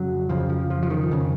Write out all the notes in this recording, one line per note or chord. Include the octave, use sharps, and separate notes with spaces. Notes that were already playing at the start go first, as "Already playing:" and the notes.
Already playing: F2 C#3 F#3
F2 C#3 F3
F3
F3
F3
D#3
F2 C#3